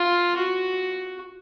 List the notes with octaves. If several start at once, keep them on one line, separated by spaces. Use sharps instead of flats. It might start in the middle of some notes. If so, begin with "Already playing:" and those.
Already playing: F4
F#4